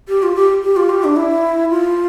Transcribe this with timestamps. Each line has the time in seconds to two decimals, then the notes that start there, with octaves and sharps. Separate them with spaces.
0.08 G4
0.23 F4
0.35 G4
0.63 G4
0.76 F4
0.89 G4
1.04 D4
1.17 E4
1.70 F4